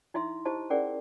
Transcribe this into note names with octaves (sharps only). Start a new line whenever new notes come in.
D#4 E4 E5 C6
E4 G4 C5 D#5 A5
C#4 G#4 A#4 D5 F#5